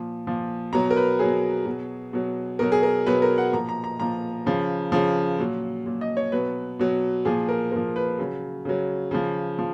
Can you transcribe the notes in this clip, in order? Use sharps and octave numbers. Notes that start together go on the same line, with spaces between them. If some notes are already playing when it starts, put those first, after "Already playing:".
Already playing: A#2 F3
A#2 F3
B2 F#3 A#5
A#4
B4
B2 F#3 G#4
B2 F#3
B2 F#3
B2 F#3 A#4
G#4
A#4
B2 F#3 B4
A#4
F#5
A#2 F3 A#5
A#5
A#5
A#2 F3 A#5
C#3 F3
C#3 F3
A#2 F#3
A#2 F#3
D#5
C#5
B2 F#3 B4
B2 F#3
A#2 F3 G#4
A#4
A#2 F3 A#4
B4
C#3 F#3
C#3 F#3
C#3 F3
F3